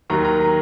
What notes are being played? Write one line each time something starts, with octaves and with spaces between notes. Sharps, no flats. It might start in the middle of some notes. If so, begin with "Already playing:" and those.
D#2 D#3 F#3 A#5
A#5
A#5